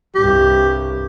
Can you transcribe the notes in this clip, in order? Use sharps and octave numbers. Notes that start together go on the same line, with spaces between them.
C2 G2 G4